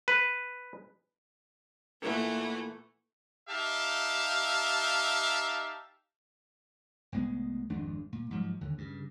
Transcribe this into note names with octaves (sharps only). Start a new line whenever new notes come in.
B4
A#2 E3 A3 B3
D#4 G4 E5 F5 A5
C2 A2 G#3 B3
G#1 F2 G#3 D4
A#2
G#2 F3 F#3
D#2 D3
G2 C#3